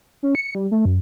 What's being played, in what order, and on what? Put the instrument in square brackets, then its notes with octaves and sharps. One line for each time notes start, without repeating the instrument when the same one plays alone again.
[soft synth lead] C#4
C#7
G3
A3
F#2